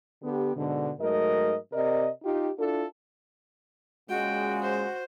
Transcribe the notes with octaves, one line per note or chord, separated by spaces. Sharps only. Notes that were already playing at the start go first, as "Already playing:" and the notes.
D3 B3 G4
G#2 B2 D3
G#2 F#3 A3 A#4 D#5
C3 A#4 D5 D#5
D#4 F4 G4
D4 E4 F4 A4
A#2 C#3 G#3 F#4 G5
C5